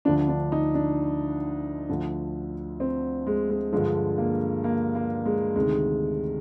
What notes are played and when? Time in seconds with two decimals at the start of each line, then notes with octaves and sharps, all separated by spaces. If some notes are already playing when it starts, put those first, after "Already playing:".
0.05 D2 D3 F3 D4
0.29 D4
0.52 D#4
0.75 D4
1.89 D2 D3 F3
2.80 C4
3.27 G#3
3.50 G#3
3.72 G2 D3 F3 G#3
4.18 A#3
4.64 A#3
4.95 A#3
5.25 G#3
5.56 D2 C3 D#3 G#3